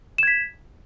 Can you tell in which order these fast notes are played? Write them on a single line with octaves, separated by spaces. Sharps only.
E7 G#6 B6